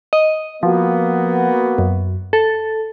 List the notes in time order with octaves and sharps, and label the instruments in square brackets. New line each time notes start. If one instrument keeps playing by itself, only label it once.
[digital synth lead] D#5
[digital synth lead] F3 [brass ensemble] A#3 B3 F#4
[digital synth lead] F#2
A4